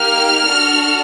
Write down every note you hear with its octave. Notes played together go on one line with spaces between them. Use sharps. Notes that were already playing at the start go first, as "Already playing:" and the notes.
Already playing: A#3 D#4 G4 F6
D4 F#4 A4